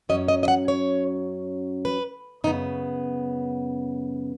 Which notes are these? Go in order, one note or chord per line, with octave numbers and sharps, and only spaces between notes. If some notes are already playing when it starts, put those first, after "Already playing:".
F#2 F#3 C#4 D#5
D#5
D#5
F#5
C#5
B4
F#2 C#3 B3 D#4